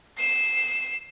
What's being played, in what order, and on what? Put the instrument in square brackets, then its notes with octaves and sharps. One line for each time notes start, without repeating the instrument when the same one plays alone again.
[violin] C7 E7